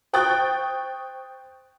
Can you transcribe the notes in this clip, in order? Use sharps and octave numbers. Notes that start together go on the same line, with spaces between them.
C5 G5 C#6 D#6 F#6 A6